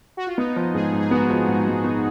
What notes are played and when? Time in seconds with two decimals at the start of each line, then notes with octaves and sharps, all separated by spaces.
0.17 F#4
0.27 F4
0.38 B3 D#4
0.56 F3
0.74 G#2 G#4
0.93 G#2
1.00 G#4
1.11 B3 F#4
1.30 F3
1.48 G#2
1.67 G#2
1.84 B3